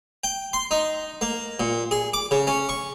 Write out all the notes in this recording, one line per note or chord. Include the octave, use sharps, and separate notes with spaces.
G5
C6
D#4
A#3
A#2
G#4
D6
C#3
C#4
C#6